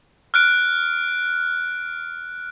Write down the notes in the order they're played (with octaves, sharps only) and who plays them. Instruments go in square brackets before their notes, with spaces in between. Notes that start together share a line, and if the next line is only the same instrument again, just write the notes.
[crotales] F6 F#6 D7